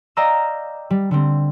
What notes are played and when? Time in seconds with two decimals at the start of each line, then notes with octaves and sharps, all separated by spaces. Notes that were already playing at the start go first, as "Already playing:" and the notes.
0.17 D5 D#5 F5 G5 A#5 E6
0.90 G3
1.11 D3 G3 C4